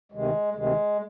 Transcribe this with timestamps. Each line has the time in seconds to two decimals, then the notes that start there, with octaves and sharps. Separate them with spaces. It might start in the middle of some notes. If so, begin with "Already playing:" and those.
0.12 D2 C3 D#3 G#3
0.54 D2 C3 D#3 G#3